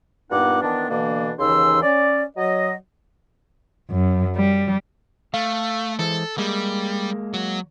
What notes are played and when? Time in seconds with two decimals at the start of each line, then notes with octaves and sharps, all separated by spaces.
0.30 G2 A#2 B3 D#4 F#5 D6
0.62 D#3 E3 B3 D4
0.90 B2 D3 E3 A#3 D4
1.39 D#2 C#3 E3 D#4 C6 E6
1.83 C#4 D5
2.37 F#3 D#5
3.89 F#2
4.35 G3
5.34 A3 F5
5.99 E3 G#3 A4 C5
6.38 G3 G#3 A#3
7.34 F#3 F#4